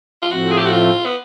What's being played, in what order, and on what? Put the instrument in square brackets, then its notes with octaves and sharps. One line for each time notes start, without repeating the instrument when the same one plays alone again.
[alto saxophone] F4
[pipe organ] A2 F3 A3 C4 [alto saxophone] F#4
[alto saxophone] G#4
G4
F#4
F4
B3